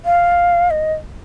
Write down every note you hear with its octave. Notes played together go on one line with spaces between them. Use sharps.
F5
D#5